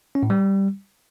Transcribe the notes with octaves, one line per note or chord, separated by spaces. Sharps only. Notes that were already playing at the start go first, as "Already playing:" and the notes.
C#4
A2
G3